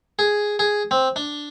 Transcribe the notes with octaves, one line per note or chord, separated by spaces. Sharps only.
G#4
G#4
C4
D4